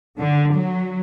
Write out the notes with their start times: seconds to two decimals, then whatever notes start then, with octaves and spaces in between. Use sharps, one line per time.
0.19 D3
0.52 F#3